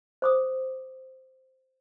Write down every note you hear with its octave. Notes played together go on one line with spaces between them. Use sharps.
C5 D6 D#6